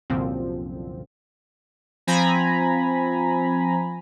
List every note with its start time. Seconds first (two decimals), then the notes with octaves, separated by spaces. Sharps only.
0.10 C2 F#2 A#2 D3 F3 C4
2.07 F3 C4 G#5 A#5 B5